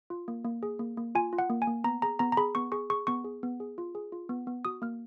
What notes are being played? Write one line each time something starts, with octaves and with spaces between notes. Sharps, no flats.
F4
A#3
A#3
G#4
A#3
A#3
F4 G#5
F4
F#5
A#3
G#5
A#3
B3 A#5
G#4 A#5
B3 A#5
A#5
G#4 B5
B3 C#6
G#4 C#6
G#4 C#6
B3 C#6
G#4
B3
G#4
F4
G#4
F4
B3
B3
F#4 D#6
A#3 F6